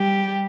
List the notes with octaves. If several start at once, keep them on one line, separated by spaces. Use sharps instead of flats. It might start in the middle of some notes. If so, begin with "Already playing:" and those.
Already playing: G3 G4